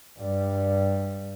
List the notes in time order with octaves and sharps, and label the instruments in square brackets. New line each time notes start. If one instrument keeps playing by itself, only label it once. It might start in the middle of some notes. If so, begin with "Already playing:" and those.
[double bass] G2 G3